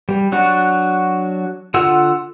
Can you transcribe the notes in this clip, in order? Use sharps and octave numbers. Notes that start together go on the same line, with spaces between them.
G3
F#3 D4 F#4
D3 F4 F#5 E6